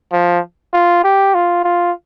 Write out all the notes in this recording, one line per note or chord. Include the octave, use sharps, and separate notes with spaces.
F3
F4
G4
F4
F4